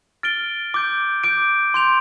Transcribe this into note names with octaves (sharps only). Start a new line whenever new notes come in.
F6 A6 D7 G7
D6 G6 D7
D6 G6 D7
C6 G6 F7